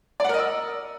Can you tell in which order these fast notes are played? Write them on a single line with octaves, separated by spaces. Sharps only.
D5 F#5 A#4 D#5 E6